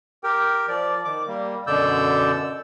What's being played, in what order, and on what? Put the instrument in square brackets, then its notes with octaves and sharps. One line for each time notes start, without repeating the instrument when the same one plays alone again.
[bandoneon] G4 A#4 G5
F3 D5
D#3 D6
G3 A#3
F#2 B2 D3 D5 E6 G6